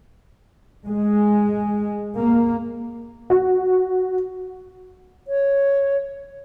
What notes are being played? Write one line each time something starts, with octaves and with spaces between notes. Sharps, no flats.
G#3
A#3
F#4
C#5